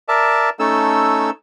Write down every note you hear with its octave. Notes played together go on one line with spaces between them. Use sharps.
A#4 D5 E5 A5
A3 C#4 D#4 A4 E6